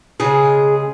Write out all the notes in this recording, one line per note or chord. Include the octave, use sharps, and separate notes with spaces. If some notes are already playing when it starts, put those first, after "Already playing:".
C#3 G#3 G#4